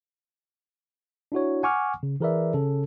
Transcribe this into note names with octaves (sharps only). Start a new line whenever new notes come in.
D4 E4 F#4 C#5
F#5 G#5 C#6 D6 F6
C#3
E3 G#4 A#4 B4 D5 E5
C#3 C#4 A4